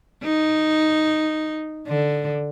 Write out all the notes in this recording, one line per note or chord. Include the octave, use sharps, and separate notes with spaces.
D#4
D3